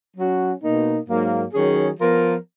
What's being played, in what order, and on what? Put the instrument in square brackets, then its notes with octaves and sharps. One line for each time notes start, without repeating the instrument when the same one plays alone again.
[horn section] F#3 C#4 F#4
B2 A#3 D#4
G#2 F#3 A#3
D#3 F#3 C#4 G#4
F3 B3 F4 A#4